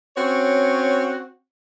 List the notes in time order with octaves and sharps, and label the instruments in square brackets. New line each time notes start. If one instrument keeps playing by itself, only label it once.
[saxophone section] C4 C#4 F#4 C#5